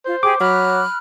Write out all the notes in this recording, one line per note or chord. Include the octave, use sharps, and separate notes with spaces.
F4 C5
G4 G#4 G5 D6
F#3 B5 F6 F#6